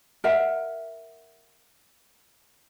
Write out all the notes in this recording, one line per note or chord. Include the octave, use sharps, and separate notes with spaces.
A#4 E5 F#5